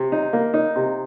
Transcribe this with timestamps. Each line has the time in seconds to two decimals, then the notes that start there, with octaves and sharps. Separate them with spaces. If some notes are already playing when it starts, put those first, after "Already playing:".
Already playing: C3
0.12 D#4
0.33 A#3
0.54 D#4
0.76 C3